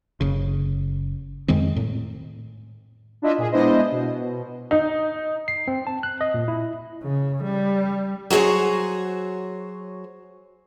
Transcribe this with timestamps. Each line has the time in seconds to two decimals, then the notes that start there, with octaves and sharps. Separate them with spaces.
0.21 F#1 C#3
1.48 F2 D#3 G#3 C4
1.76 A2
3.22 D4 E4 F4 D#5 E5
3.38 A#2 G#4
3.52 G#3 B3 D4 E4 C5 D#5
3.92 B2
4.71 D#4
5.48 C7
5.68 C4
5.87 A5
6.03 F#6
6.21 D#5
6.34 A#2
6.48 E4
7.03 C#3
7.44 G3
8.30 F#3 F#4 G#4 C5 C#5